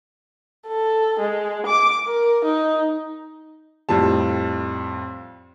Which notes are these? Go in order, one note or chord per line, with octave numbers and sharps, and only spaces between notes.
A4
G#3
D6
A#4
D#4
F2 A2 G3 A5